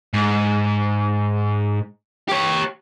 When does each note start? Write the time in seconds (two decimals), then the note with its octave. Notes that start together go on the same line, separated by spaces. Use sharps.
0.14 G#2
2.28 G4 C#5